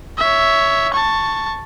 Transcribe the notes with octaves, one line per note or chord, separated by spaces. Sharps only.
C#5 E5
A5 C#6